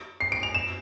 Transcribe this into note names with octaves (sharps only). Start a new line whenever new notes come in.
C7
D7
F7
E7